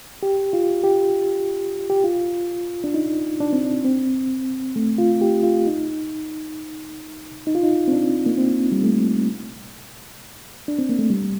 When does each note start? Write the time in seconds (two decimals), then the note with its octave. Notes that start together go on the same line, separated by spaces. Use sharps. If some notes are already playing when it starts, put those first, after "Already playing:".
0.23 G4
0.53 F4
0.83 G4
1.90 G4
2.04 F4
2.84 D4
2.94 D#4
3.40 D4
3.53 C4
3.65 D4
3.85 C4
4.76 A3
4.98 F4
5.21 G4
5.43 F4
5.67 D#4
7.47 D#4
7.55 F4
7.63 D#4
7.88 C4
7.92 D4
8.26 A#3
8.38 C4
8.72 G3
8.83 A3
10.68 D4
10.79 C4
10.89 A#3
10.99 A3
11.10 G3